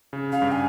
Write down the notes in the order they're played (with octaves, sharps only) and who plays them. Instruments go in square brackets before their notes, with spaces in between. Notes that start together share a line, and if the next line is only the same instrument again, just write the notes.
[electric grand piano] C#3
[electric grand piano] C#3 [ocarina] F5
[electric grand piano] G2
[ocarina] G#5